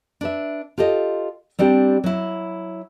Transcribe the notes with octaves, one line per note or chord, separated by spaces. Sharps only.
D4 B4 E5
F4 G4 A4 D#5
G3 C4 D4 G4
F#3 E4